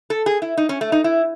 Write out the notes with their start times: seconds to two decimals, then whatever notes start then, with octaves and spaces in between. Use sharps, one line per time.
0.10 A4
0.26 G#4
0.42 E4
0.57 D#4
0.69 C#4
0.81 A3
0.92 D#4
1.04 E4